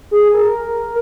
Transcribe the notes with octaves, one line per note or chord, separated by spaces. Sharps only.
G#4
A#4